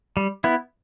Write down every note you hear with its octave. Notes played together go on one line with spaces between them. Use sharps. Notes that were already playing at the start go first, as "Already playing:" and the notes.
G3
B3 E4